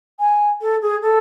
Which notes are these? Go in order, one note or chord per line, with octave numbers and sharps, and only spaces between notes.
G#5
A4
G#4
A4